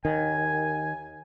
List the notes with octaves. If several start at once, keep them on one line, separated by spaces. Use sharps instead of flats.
D#2 D#3 G#5